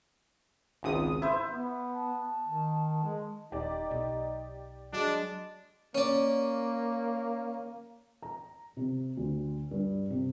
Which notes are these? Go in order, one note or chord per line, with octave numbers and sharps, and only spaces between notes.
G#1 C#2 D#6
E4 C5
B3
A5
D#3
G#3
D#1 D#4 G4 D5
B1
F#3 G#3 D4
A#3 C#4 D5
A#5
C3
D2
G2
C3